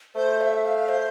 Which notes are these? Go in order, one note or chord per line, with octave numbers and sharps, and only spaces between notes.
A3 C5
F5
E5
F5
C5